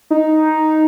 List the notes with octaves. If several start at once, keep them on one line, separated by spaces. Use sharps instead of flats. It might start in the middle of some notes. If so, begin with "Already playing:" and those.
D#4